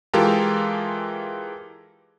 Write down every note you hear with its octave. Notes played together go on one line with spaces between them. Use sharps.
E3 G#3 F4 G4 A4 A#4